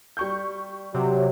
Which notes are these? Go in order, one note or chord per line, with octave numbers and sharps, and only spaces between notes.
G3 C#6 G6
C3 F#3 G4 C#5